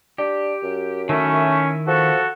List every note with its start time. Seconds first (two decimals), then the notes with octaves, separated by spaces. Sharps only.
0.18 D4 G4
0.63 F#2
1.09 D#3 A3 C#4 E4
1.87 F3 F#4 A4